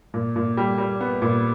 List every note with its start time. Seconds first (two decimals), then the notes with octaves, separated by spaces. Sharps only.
0.14 A#2
0.36 A#2
0.57 G3
0.78 G3
1.00 B3
1.22 A#2